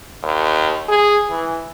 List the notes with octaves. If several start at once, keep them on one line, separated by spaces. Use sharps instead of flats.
D#2
G#4
E3